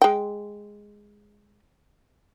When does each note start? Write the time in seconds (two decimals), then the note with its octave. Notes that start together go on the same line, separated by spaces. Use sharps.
0.02 G#3 G5